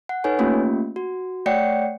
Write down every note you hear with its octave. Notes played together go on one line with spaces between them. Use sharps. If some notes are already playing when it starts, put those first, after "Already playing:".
F#5
D#4 A4 B4 C#5 G#5
A3 A#3 C#4 F4 G4
F#4
A3 C#5 D5 F#5 G5 C#7